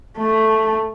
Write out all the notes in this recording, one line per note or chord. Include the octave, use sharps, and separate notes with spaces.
A3